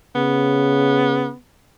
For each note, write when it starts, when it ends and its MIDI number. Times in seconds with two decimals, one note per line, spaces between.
0.15 1.29 49
0.15 1.36 59